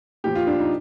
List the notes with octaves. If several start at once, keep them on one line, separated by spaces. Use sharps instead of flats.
A#2 F3 G4
F4
D4
D#4